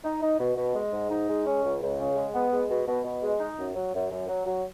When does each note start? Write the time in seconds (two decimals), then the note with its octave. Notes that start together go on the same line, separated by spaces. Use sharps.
0.04 D#4
0.22 D#4
0.40 B2
0.56 B2
0.75 G#3
0.93 G#2
1.10 D#4
1.28 G#3
1.46 C#4
1.64 C#2
1.82 C#2
1.99 C#3
2.16 G#3
2.34 B3
2.52 G#3
2.70 B2
2.88 B2
3.04 B2
3.23 G#3
3.40 D#4
3.58 F#2
3.75 F#3
3.94 F#2
4.11 F#2
4.28 F#3
4.46 F#3